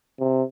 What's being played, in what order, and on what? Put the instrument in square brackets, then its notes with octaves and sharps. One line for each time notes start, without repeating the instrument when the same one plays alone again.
[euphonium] C3